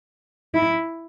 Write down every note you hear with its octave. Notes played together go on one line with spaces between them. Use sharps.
E4